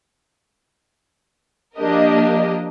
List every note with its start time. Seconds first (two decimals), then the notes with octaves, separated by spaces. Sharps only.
1.76 F3 A#3 D4 G4 A#4 D#5